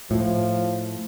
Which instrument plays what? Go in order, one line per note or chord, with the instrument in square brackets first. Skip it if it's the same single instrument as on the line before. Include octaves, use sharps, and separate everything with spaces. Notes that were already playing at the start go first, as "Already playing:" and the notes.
[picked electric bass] A2 [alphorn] F3